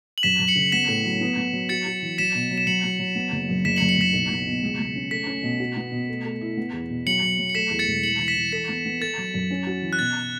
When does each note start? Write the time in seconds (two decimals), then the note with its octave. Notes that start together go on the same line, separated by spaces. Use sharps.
0.18 F#7
0.23 F#2 B6 E7
0.40 F#2
0.48 C#7 F#7
0.55 C#3
0.72 B3 B6 E7
0.88 A2
1.05 F#3
1.21 B3
1.37 B3
1.53 F#3
1.69 F#4 A6 C#7
1.86 F#4
2.02 E3
2.18 F#3 B6 E7
2.35 B2
2.51 F#3
2.58 E7
2.67 F#3 C#7 F#7
2.84 F#3
2.99 F#3
3.15 B3
3.32 F#1
3.49 F#2
3.65 F#1 B6 E7
3.76 C#7 F#7
3.81 F#1
3.89 C#7 F#7
3.97 F#1 B6 E7
4.13 B1
4.30 B3
4.47 B2
4.63 C#2
4.79 C#2
4.95 C#4
5.11 A3 B6
5.27 C#4
5.43 B2
5.60 F#4
5.77 B3
5.92 B2
6.09 A3
6.25 A3
6.41 E4
6.57 B3
6.73 E2
6.90 B2
7.06 F#3 C#7 F#7
7.22 F#3
7.39 F#3
7.49 C#7
7.55 A3 B6 E7
7.71 E2
7.79 A6 C#7
7.87 E1
8.03 E3 C#7 F#7
8.19 E3
8.28 B6 E7
8.37 E3
8.52 A4 B6
8.69 B3
8.85 B3
9.01 A4 A6
9.18 F#3
9.34 F#2
9.51 C#4
9.67 F#4
9.82 E3
9.93 F#6
9.99 B2 A6